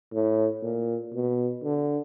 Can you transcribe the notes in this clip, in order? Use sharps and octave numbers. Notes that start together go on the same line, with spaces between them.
A2
A#2
B2
D3